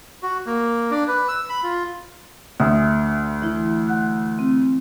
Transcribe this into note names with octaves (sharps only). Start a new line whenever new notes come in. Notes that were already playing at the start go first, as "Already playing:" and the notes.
F#4
A#3
D4
B4
E6
B5
F4
D2 E5 D#6
E3 E4
F#5 F#6
C4